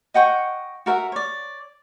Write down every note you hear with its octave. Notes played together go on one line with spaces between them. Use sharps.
D#5 F#5 G5 C#6
F#4 A#4 E5 F#5
C#5 D5